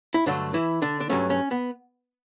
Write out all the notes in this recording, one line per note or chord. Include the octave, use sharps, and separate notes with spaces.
E4
G2 D3 F#3 A3 D4
E3 E4
D3 D4
D4
G2 F#3 A3 C#4
C#4
B3